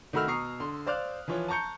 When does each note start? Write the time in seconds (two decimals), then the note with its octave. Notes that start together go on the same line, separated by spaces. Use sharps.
0.13 D#3 A3 F#4 B5 E6 F6
0.27 B2 A#5 C#6 D#6 C7
0.60 D3 C6
0.86 C5 D5 F5 D6 F6 F#6
1.28 E3 F3 F4 C#5
1.48 A5 A#5 C#6 G6 C#7